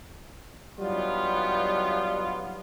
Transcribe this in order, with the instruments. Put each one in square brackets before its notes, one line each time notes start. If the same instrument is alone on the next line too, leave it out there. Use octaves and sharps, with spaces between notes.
[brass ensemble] F#3 G3 B3 D4 D#4 F4